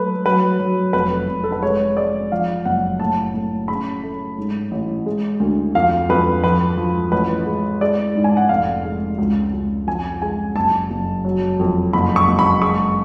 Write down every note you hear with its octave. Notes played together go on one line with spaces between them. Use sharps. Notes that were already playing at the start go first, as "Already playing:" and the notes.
Already playing: F#3 A3 B4
F#3 B4
F#3
F1 B4
F1
A4
B4
G#3 C#5
G#3 D5
F3 F5
F#1 F#5
A2 A5
A2
C#3 B5
A3
G#2
A1
G#3
D2
F2 F5
F2 B4
F3 B4
F3
A1 B4
G#3
G#3 D5
G#2
G#5
F#5
F1 F5
G#3
C#2
C#2
F2 G#5
G#3 G#5
F#1 A5
F#1
F#3
F2
F#1 B5
C#6
F#1
B5
G#3 C#6